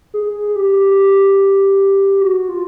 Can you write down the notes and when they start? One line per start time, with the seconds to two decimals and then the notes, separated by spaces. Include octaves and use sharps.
0.14 G#4
0.56 G4
2.21 F#4
2.49 F4